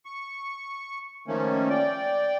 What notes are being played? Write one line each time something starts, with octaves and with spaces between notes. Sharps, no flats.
C#6
D#3 F3 A3 A#3 C#4
D5 G5